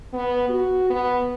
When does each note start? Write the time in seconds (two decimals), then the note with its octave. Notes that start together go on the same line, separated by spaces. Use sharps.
0.13 B3
0.49 F#4
0.90 B3